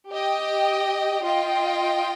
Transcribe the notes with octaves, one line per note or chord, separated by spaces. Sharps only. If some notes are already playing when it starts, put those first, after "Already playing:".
G4 D#5 G5
F4 D#5 G5